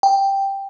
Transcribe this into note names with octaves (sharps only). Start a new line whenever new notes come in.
G5